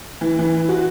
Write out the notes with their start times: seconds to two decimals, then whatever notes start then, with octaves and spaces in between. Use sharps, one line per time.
0.21 E3
0.39 E3
0.69 F#4